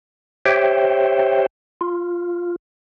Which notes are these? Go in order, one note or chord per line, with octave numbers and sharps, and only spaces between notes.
G4 C5 C#5 E5 G5
F4